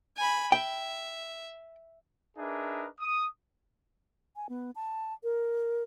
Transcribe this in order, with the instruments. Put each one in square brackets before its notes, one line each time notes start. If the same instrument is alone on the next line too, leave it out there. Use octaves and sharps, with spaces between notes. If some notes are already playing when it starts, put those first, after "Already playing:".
[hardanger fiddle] G#5 B5
[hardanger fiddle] E5 [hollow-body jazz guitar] G5
[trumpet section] D4 D#4 G#4 A#4 B4 E5
D#6
[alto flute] G#5
B3
A5
A#4